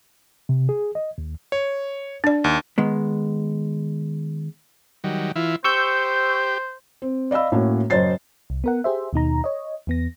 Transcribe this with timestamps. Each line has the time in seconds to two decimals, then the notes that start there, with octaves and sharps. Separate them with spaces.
0.49 C3
0.69 G#4
0.95 D#5
1.18 D#2
1.52 C#5
2.24 D4 D5
2.44 D#2
2.78 D#3 G#3 B3
5.04 D#3 F#3 G3
5.36 E3 E4 F4
5.64 G4 C5 C#6 E6 G6
7.02 C4
7.31 D5 D#5 F5 B5 E6
7.52 A2 A#3 C#4 F#4
7.90 F#1 C5 C#5 D#5 A6 C7
8.50 C2
8.64 B3 A#4 F#5
8.84 G4 G#4 C5 E5
9.13 D#2 B2 D#4 A#5
9.44 C#5 D#5
9.87 E2 B3 A#6